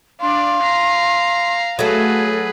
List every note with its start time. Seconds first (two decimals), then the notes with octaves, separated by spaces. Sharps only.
0.21 D4 D5 F5 C6
0.62 A#5 C7
1.79 F#3 A3 G#4 A4 B4